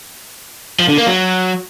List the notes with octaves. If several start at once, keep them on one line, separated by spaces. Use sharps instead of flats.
F3
D3
A#3
F#3